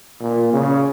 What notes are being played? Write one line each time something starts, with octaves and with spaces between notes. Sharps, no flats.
A#2
C#3